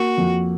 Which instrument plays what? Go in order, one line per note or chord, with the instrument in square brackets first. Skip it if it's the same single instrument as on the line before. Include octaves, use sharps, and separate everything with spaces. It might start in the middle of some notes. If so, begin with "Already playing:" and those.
Already playing: [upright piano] A#3 [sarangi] F#4
[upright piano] F2